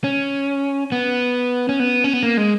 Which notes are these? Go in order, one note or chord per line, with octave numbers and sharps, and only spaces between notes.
C#4
B3
C#4
B3
C#4
B3
A#3
G#3